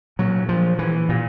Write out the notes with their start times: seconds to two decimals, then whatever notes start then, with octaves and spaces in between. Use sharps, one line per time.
0.19 A#2 F#3
0.49 F3
0.79 E3
1.09 A#2